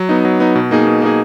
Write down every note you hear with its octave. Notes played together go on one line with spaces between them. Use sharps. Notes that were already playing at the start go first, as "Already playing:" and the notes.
Already playing: F#3
B3 D#4
F#3
B3 D#4
B2
A#3 D#4 G#4
B2
A#3 D#4 G#4